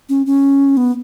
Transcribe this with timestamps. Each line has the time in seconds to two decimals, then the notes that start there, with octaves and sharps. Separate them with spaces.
0.09 C#4
0.26 C#4
0.77 B3